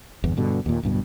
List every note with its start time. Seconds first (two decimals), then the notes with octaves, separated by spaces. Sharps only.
0.24 G1 E2
0.37 G2 B2 D3
0.66 D#2 A#2
0.83 D1 G2 B2